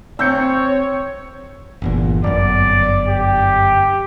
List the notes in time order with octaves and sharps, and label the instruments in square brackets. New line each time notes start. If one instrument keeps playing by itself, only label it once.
[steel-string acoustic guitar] C4 [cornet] C#5 [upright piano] E6 G6 C#7
[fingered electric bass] G1 E2 A#2
[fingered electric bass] G1 F#2 [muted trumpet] D5
[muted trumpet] G4